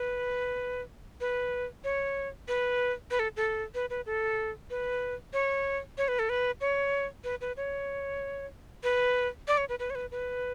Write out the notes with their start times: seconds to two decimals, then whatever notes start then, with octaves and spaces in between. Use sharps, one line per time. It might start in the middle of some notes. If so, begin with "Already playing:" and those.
Already playing: B4
1.21 B4
1.84 C#5
2.48 B4
3.11 B4
3.19 A4
3.37 A4
3.75 B4
3.90 B4
4.06 A4
4.70 B4
5.33 C#5
5.98 C#5
6.08 B4
6.19 A4
6.29 B4
6.61 C#5
7.24 B4
7.41 B4
7.57 C#5
8.83 B4
9.48 D5
9.58 C#5
9.69 B4
9.79 B4
9.90 C#5
9.95 B4
10.11 B4